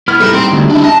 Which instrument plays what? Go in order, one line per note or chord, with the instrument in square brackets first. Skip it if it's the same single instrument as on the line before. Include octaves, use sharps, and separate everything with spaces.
[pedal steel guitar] B3 F6 [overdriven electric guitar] E4
[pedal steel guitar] G3 D#4 E4 [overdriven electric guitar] A4 B5
[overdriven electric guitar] C4 C6
D2
D4 E4
[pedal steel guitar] D#4 D#5 [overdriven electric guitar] A5